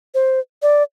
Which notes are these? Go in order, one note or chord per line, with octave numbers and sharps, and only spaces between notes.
C5
D5